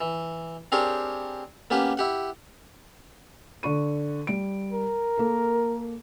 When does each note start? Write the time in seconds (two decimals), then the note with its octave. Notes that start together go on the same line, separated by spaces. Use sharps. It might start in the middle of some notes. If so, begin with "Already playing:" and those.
0.01 E3
0.72 C4 D4 G4 G#4 A#4 C#5
1.70 A#3 B3 C#4 G4 B4
1.97 E4 G4 F#5
3.63 D3 C#6 D#7
4.27 G3 D7
4.73 A#4
5.17 A#3 A4